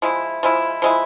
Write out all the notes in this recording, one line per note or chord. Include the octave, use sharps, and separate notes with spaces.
F3 G#3 E4
F3 G#3 E4
F3 G#3 E4